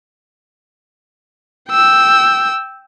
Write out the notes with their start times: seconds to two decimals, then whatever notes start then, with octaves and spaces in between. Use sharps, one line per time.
1.69 G5 E6